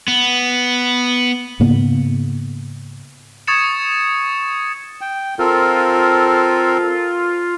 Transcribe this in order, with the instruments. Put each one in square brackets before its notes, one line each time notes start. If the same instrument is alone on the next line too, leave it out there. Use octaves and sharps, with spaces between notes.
[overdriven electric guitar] B3
[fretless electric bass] G#2 C#3 A#3 B3
[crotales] C#6 D#6 G#6 A6 C#7 E7
[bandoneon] G5
[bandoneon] C4 A4 A#4 [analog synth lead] F4